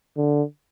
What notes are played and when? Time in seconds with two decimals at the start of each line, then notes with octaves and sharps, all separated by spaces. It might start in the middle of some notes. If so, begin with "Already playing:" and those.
0.17 D3